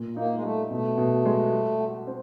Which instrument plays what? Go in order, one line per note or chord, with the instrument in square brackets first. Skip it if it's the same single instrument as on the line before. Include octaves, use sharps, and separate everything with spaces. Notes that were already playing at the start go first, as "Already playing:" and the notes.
Already playing: [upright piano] A#2
[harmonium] A#3 [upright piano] D#4
[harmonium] G#3
[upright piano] G3 [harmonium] A3
[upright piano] B2 [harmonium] A3
[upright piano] B2
G#3
G3
F#4
C4